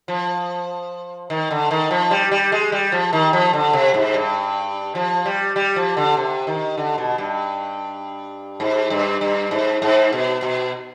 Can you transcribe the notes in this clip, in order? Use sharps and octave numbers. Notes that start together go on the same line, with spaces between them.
F3
D#3
D3
D#3
F3
G3
G3
G#3
G3
F3
D#3
F3
D3
C3
G#2
G2
F3
G3
G3
F3
D3
C3
D#3
D3
B2
G2
G#2
G2
G2
G#2
G#2
B2
B2